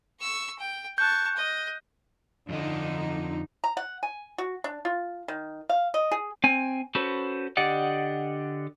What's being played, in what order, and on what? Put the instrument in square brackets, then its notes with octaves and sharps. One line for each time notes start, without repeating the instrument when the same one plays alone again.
[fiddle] C#6 E6
G5
[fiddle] A5 C#6 [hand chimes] F#6 G6
[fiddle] D#5
[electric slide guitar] F2 F3 D#5 [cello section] D3 D#4
[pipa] A#5
F#5
G#5
F#4
D4
F4
D#3
F5
D#5
G#4
[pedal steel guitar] C4 G#5
C#4 F#4 A4 B4 C5
D3 G4 D5 D#5 F#5